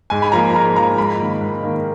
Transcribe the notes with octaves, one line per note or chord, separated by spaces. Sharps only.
G#2 G#5
B5
F3 A#3 A#5
G#2 A#5
F3 A#3 A#5
G#2 B5
D#3 A#3
G#2
D#3 A#3